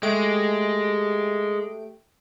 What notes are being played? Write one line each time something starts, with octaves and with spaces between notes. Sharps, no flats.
G#3 A3 G4 D7